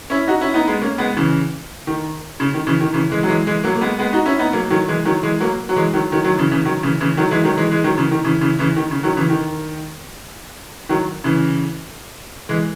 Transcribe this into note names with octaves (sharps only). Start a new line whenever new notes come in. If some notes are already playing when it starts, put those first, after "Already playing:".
C#4 E4
D#4 F#4
C#4 E4
B3 D#4
G#3 B3
A#3 C#4
G#3 B3
C#3 E3
D#3
C#3
D#3
C#3 E3
D#3
C#3 E3
E3 G#3
F#3
E3 G#3
E3 G#3
F#3 A#3
A#3
G#3 B3
G#3 B3
D#4 F#4
C#4 E4
B3 D#4
F#3 A#3
D#3 F#3
E3 G#3
D#3 F#3
E3 G#3
F#3 A#3
F#3
E3 G#3
D#3 F#3
D#3 F#3
D#3 F#3
C#3 E3
C#3 E3
D#3 F#3
C#3 E3
C#3 E3
D#3 F#3
E3 G#3
D#3 F#3
E3 G#3
E3 G#3
D#3 F#3
C#3 E3
D#3
C#3 E3
C#3 E3
C#3 E3
D#3
C#3
D#3 F#3
C#3 E3
D#3
D#3 F#3
C#3 E3
E3 G#3